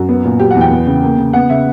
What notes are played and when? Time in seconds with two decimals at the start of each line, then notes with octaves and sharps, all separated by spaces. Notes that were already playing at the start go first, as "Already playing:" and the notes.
Already playing: F#2 F#4
0.09 B3
0.25 A#2
0.39 F#3 G4
0.51 F#5
0.55 E2
0.61 G5
0.71 B3
0.87 C#3
1.03 A#3
1.18 C#3
1.33 B3 F#5
1.49 C#3 E5